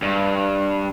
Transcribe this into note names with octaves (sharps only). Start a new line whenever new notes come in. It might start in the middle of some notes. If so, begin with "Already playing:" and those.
G2